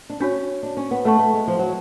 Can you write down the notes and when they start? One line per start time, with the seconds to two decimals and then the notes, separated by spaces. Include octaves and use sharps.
0.10 D4
0.20 C#4 D4 F#4 C#5
0.63 D4
0.77 C#4
0.91 B3
1.05 A3 B4 F#5 A5 C#6
1.19 A3
1.34 G#3
1.48 F3
1.59 F#3